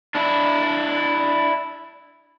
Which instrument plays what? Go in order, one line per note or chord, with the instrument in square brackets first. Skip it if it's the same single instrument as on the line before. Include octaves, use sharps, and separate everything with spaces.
[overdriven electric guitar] D4 E4